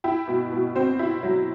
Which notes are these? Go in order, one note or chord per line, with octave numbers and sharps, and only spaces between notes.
E4 G5
B2
B2
C4 C5
E4
F#3